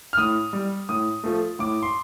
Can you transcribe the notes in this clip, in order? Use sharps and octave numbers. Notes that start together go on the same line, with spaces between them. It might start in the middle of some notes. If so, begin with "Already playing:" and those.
F6
A2 D#6
G3
A2 D#6
F3 A3
A2 D6
C6